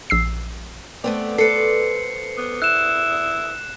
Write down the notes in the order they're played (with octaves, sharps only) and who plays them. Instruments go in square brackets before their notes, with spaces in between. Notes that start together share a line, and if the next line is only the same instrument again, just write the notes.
[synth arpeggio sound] A#1 E6 C7
[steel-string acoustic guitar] A3 B3 C4 [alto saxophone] D5
[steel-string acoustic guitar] A4 B4 C5 [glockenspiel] C7 C#7
[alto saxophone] B3
[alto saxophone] E4 [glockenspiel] F#6 E7